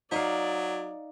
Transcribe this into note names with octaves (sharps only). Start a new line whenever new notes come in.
F#3 D#4 D5 F5